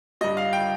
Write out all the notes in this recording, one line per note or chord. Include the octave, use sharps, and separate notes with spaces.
G2 G3 D#5
F5
G5